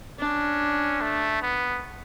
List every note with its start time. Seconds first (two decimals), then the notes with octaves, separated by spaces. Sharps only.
0.19 C#4 D4
1.01 A3
1.42 B3